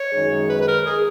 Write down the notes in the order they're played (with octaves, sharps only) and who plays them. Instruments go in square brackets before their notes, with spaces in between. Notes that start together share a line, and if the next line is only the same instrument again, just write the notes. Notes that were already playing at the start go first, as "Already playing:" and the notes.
Already playing: [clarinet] C#5
[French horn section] F#2 D#3 G#3 D#4 G#4
[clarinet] B4
B4
A#4
G#4